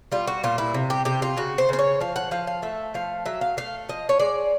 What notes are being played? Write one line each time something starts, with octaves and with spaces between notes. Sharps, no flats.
G3 F4
F#4
A#2 F4
E4
C3
G4
C3 G4
F4
C#3 F#4
C5
C#3 C5
C#5
F3 F5
F#5
F3 F5
F5
A3 E5
F3 F5
F#3 E5
F5
A3 F5
F3 D#5
C#5
G#3 D5